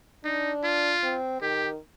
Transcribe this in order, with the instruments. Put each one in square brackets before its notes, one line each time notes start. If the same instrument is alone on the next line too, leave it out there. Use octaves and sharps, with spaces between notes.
[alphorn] D4 [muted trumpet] D#4
[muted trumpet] F4
[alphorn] C4
[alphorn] D#3 [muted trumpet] G4